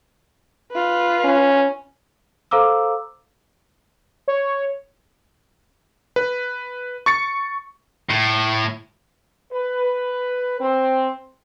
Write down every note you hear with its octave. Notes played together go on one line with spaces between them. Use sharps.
F4 B4
C#4
A4 C5 F5 A#5 D6 E6
C#5
B4
C#6 A6 C#7
A2
B4
C4